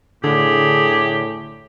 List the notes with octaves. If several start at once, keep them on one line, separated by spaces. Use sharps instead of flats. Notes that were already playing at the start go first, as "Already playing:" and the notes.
A2 D3 G4 G#4